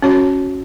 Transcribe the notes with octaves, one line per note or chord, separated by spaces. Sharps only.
C#4 F#4 C#5